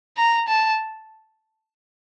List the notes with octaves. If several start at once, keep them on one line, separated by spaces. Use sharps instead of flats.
A#5
A5